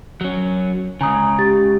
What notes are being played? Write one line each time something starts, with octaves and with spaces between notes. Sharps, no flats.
F#3 C#4
C#2 C#3 G#5 A#5 D#6
G4 A6